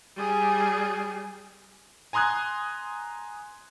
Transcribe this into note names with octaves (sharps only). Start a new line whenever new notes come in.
G3 G#4
G#5 A#5 C6 D#6 F#6 G#6